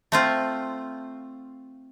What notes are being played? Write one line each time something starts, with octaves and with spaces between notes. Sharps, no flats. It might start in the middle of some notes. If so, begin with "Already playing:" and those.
A3 C4 F4